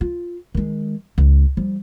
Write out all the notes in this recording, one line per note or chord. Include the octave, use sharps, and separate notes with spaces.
F4
D#3 G#3
C#2
F3 G3